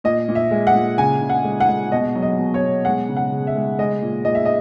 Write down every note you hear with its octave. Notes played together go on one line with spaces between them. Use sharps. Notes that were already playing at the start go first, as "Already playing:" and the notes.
A#2 D#5
A#2
E5
G#3
F#5
A#2
C#3 G#5
C#3
F#5
G#3
F#5
G#3
B2 D#5
F#3
D#5
B2
C#5
B2
G#3 F#5
C#3
F#5
C#3
E5
G#3
G#3 D#5
A#2
A#2 D#5
E5
D#5